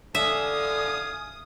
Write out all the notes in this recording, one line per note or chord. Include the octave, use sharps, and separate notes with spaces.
D3 E5 F5 G#5 D#6